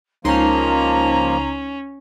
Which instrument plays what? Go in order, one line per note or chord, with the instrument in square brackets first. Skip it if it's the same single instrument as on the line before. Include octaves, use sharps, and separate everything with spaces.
[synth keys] C#2 D#4 C6 [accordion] F3 A#3 [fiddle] C#4 [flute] A#5